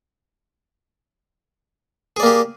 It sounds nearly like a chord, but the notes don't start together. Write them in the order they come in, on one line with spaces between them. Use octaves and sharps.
G#4 D5 A#3 G4